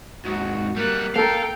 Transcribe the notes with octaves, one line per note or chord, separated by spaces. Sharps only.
D#2 G#2 F#4
G3 A#3 B3 F#6
A#3 A4 A#4 F5 G5